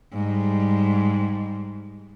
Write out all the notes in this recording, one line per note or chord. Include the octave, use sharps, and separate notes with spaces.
G#2 G3